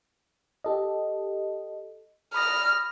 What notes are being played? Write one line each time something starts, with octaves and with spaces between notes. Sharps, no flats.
G4 A4 D#5
B5 D#6 F6 A#6